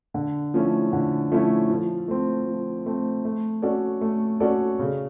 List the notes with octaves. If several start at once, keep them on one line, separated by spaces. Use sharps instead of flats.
D3
F3 A3 C#4 E4
D3
F3 A3 C#4 E4
F3
A3 C4
F3
A3 C4
A3
C#4 F#4 A4 D5
A3
C#4 F#4 A4 D5
C#3